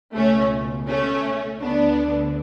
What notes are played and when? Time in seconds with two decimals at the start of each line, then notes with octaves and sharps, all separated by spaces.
0.16 C#2 B2 A3 C#4
0.89 A3 C#4
1.61 D2 D3 B3 D4